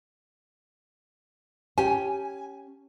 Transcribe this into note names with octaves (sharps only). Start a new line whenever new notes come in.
C#4 G4 G#5